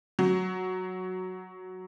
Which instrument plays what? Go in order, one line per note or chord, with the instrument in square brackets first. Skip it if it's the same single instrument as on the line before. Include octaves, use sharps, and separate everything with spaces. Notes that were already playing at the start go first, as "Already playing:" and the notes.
[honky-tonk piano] F#3